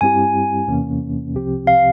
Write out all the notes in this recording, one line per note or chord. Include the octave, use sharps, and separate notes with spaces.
G2 G3 C4 E4 G4 G#5
E2 C3 E3 A#3 C#4
C2 C3 F3 C4 G4
F5